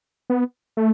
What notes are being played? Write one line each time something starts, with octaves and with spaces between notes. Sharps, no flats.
B3
A3